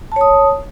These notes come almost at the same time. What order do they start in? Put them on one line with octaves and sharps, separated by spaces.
A5 C#5 D#6